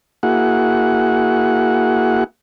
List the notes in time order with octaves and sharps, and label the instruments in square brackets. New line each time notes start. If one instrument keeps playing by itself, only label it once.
[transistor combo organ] A#3 E4 F#4 G#4 F#5